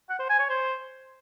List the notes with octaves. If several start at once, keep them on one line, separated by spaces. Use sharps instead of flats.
F#5
C5
G#5
C#5
C5